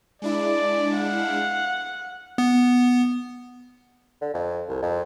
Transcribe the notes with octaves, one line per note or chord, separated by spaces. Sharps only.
G#3 D4 E4 D5
F5 F#5
B3
D3
F2
C2
F2